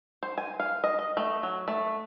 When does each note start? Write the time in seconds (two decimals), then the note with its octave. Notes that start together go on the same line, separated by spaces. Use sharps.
0.23 C5
0.38 G#5
0.60 F5
0.84 D#5
0.99 D#5
1.17 A3
1.43 F#3
1.68 A3